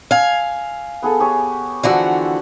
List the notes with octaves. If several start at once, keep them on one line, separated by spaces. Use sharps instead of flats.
F5 G#5 E6
B3 G#4 A4
G4 G#4 C#5
D3 E3 F3 F#4 B5 E6